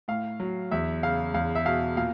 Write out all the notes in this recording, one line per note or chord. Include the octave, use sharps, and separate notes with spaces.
A2 F5
F#3
E2 E5
C#3 F5
E2 F5
E5
B2 F5
A#2 F5